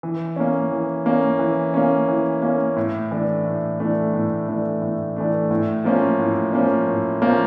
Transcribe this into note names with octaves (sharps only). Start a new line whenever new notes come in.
E3
A#3 C#4
E3
A#3 C#4
E3
A#3 C#4
E3
A#3 C#4
A2
E3 A3 D4
A2
E3 A3 D4
A2
E3 A3 D4
A2
E3 A3 D4
A2
F3 A#3 C#4
A2
F3 A#3 C#4
A2
F3 A#3 C#4